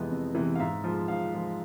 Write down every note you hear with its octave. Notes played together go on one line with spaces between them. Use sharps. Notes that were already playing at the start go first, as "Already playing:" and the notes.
Already playing: F2 C3 E3 G#3 B3 D#5
F2
C3 E3 G#3 B3
F5
G#2 E5
F3 G#3
G#2 F5
F3 G#3